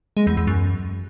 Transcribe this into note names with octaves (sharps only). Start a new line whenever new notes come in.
G#3
E2
E2
F#2